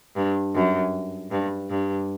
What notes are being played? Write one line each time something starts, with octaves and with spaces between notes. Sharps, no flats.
G2
F#2
G2
G2